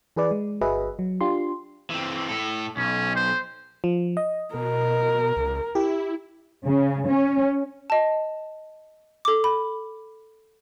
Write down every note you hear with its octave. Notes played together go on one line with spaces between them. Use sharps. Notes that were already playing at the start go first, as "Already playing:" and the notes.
E3 G#4 B4 D5
G#3
G1 F#4 G#4 B4 D#5 E5
F#3
D4 F4 G4 C6
E3 C4
A2 A4
B1 C#4
C5
F3
D#5
B2 A#4
C#2
E4 G4
C#3
C#4
D#5 A5
A4 D6
B5